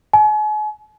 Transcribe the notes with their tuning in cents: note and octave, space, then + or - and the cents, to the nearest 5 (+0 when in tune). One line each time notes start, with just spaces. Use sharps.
G#5 +40